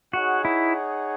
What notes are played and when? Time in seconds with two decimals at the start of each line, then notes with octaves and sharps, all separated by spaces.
0.13 D#4 F#4 G#4 C#5 F#5
0.45 E4